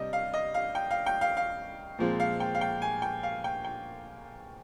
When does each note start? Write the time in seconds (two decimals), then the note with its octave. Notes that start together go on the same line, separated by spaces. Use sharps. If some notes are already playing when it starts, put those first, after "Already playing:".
Already playing: C3 G3 D4 D#5
0.13 F5
0.34 D#5
0.54 F5
0.75 G5
0.91 F5
1.06 G5
1.21 F5
1.37 F5
1.99 A#2 F3 G#3 C4
2.20 F5
2.40 G5
2.55 F5
2.61 G5
2.82 G#5
3.02 G5
3.23 F5
3.44 G5
3.64 G5